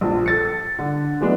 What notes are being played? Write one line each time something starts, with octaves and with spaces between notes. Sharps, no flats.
A#1 F3
A4 A6 C#7
D3
E3 F#3 G#3 A3 B3 D4